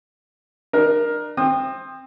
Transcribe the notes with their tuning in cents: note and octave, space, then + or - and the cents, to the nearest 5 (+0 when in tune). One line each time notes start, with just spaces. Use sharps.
D4 +40 A#4 +15
C4 +15 D#6 -20